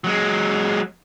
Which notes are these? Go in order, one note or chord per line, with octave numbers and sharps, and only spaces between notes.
F#3 G#3